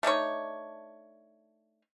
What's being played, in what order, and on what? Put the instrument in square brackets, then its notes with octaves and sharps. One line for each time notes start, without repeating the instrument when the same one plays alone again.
[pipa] A3 D4 D#4 C#5